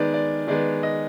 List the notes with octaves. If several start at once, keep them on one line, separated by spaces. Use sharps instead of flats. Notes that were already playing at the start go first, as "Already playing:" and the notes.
Already playing: D#3 G#3 B3 D5
D5
D#3 G#3 B3 D5
D#5